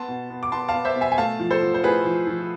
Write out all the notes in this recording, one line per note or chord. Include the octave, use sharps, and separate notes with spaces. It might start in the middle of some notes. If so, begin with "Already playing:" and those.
Already playing: B3 A5 C6
B2
B3
D6
B3 A5 C6
F5 A5
B3
C5 E5
B2
E5 G#5
G#5
A3 F5 A5
F3
A4 C5
F3
C5
A2 G#4 B4
F3
F3